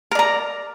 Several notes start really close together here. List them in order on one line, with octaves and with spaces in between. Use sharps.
A#4 D5 A#5